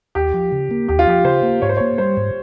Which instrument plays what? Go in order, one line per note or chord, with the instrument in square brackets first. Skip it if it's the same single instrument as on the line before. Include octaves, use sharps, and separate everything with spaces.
[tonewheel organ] D#2 [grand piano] G4
[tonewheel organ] F3
C#3
A#3
[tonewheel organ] D#2 [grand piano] G4
[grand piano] F4
[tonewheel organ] F3 [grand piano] G4
[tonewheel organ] C#3 [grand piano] C5
[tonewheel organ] A#3
[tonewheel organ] G#2 [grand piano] C#5
[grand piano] C5
[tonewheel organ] A#3 [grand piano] C#5
[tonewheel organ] G3 [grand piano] C5
[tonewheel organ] G#2